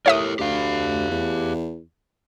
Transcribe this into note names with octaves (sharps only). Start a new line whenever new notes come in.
A2 G4 A#4 C#5 E5 D#6
D2 G4 F5
E2